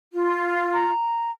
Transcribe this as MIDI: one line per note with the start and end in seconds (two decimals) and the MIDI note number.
0.14 0.90 65
0.74 1.31 82